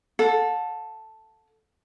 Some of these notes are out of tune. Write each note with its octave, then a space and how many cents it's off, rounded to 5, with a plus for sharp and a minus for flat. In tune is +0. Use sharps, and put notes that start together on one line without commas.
A4 +0 F#5 -45